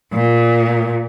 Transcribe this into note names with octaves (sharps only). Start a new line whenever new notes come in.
A#2